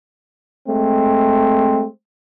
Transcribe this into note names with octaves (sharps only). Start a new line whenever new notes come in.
G#3 A3 C4